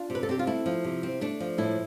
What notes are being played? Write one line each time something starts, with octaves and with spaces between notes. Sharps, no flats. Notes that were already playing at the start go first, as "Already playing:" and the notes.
Already playing: D4 F4
C3
B4
A4
C4 G4
F4
A3 E4
F3
C3
C4
A3 D4
F3
A2 E4